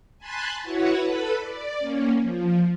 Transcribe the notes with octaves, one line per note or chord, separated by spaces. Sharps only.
G#5 A5 B5 C6 F#6 A6
E4 F#4 B4 C#5 F#5
A4 B4 B5
D5
A#3 C#4
F3